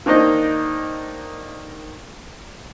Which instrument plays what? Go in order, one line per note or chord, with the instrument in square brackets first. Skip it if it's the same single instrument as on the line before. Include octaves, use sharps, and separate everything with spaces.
[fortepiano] D#3 A#3 D4 D#4 C5 D#5